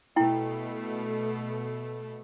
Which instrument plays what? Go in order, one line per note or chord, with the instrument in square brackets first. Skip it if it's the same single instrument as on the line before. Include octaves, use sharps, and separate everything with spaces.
[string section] B2 A3 [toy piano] E4 G5